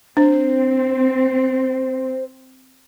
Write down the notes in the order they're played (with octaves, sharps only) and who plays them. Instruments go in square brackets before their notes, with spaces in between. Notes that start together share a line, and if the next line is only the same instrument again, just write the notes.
[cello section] C4 [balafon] D4 [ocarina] C5